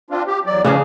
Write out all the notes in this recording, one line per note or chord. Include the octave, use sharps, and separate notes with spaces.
C4 D4 F4
G4
E2 F#3 D5
C#3 E3 F3 C#4 D4 G#4